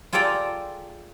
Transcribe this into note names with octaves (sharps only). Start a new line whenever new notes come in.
F4 G#4 A4 D5 G5 A#5